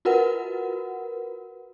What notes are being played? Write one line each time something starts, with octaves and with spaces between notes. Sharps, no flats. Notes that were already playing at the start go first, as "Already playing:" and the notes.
F4 F#4 A#4 B4 F#5